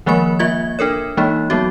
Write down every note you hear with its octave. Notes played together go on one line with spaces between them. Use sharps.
D#3 F3 G#3 A#3 A#4 B5
A#3 F4 E5 G#6
D4 A4 A#4 C#5
E3 G#3 A#3 D#4
F#3 G#3 B3 F#4